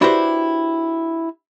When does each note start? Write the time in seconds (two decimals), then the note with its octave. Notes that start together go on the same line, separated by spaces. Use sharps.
0.01 D4 E4 F#4 G4 B4 C5